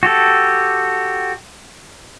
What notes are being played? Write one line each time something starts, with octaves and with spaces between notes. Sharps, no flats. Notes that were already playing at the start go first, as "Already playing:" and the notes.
F#4 G4 A4